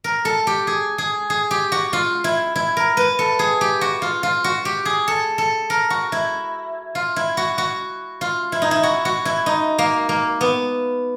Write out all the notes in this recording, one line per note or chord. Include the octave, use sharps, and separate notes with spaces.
A#4
A4
G4
G#4
G#4
G#4
G4
F#4
F4
E4
E4
A#4
B4
A4
G#4
G4
F#4
F4
F4
F#4
G4
G#4
A4
A4
A#4
F#4
E4
F4
E4
F#4
F#4
F4
E4
D#4
E4
F#4
F#4
E4
D#4
A#3
A#3
B3